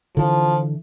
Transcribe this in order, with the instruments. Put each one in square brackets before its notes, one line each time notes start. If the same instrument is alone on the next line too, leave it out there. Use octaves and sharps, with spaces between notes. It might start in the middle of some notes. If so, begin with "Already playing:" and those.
[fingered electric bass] D3 E3 [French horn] F3